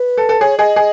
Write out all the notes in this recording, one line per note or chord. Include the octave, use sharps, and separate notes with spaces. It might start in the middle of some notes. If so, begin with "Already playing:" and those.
Already playing: B4
A4
A4
G#4 C#5
G#4 D#5
G#4